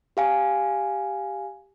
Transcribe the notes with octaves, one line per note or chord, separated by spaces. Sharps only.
G4 F5 G#5